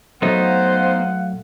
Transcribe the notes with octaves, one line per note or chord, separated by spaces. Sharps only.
F#3 A3 B3 D#4 C5 F5 F#5